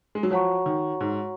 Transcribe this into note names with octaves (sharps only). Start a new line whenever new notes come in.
G#3
F#3
F3 F#4 C#5 F#5 A#5 C#6
D#3
G#2